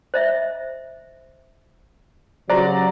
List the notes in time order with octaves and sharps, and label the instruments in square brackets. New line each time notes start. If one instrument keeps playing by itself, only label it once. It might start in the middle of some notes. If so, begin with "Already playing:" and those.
[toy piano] C5 D#5 E5
[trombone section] C#3 F#3 [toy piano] F#4 G4 C5 [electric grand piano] D5 A#5